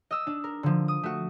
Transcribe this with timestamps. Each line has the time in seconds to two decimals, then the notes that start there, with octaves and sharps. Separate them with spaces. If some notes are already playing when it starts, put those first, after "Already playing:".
0.11 D#5 E6
0.27 D4
0.44 A#4
0.63 D3 F3
0.88 D#6
1.03 A3 F#4